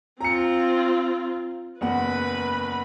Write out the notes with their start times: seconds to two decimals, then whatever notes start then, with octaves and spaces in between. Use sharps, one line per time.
0.21 C4 F4 A#5 C#7
1.81 F#1 E2 B4 F#5 B5